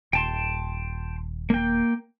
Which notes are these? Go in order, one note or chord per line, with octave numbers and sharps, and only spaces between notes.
D#1 G5 A5 C6
A#3 G5